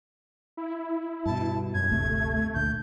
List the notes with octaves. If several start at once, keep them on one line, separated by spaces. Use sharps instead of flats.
E4
G2 B2 A5
F#2 G#6
G1 D2 C3 A3
D2 A#2 D3 G6